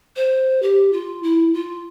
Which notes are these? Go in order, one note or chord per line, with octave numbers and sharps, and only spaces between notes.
C5
G4
F4
E4
F4